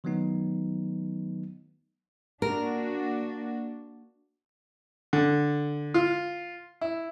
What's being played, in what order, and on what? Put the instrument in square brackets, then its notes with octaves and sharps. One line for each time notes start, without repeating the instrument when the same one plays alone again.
[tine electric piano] D#3 F#3 A3 B3 D#4
[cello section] A#3 D4 F#4 [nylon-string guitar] A#4
[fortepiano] D3
F4
E4